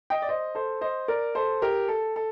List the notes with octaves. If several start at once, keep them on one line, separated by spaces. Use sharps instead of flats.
D#5 G5
D5
C5 D#5
A4 C5
C5 D#5
A#4 D5
A4 C5
G4 A#4
A4
A4